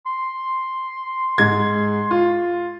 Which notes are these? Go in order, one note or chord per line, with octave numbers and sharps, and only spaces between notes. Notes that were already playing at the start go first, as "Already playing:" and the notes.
C6
G#2 G#6
F4